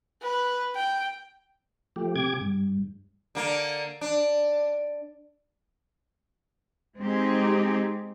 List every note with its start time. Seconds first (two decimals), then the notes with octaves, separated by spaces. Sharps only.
0.22 B4
0.76 G5
1.96 F3 A3 G4
2.16 C3 G4 D6 G#6
2.41 G2
3.35 D3 A#3
4.01 D4
7.00 G#3 C4 D#4 G4 G#4